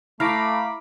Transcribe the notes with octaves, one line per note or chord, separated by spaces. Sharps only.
A3 E4 F5 A#5 B5 D6